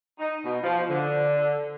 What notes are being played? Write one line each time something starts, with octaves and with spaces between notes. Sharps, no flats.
D#4
B2
F3
D3